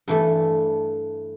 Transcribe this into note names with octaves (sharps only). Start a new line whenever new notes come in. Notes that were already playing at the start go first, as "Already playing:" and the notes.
G2 E3 A3